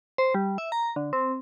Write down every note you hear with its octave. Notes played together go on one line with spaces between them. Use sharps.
C5
G3
E5
A#5
D3
C4